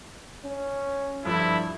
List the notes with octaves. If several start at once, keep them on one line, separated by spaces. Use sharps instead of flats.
C#4
G2 D3 F3 G3 E4